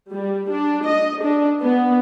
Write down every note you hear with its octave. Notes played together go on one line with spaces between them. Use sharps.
G3
D4
D#5
D4
B3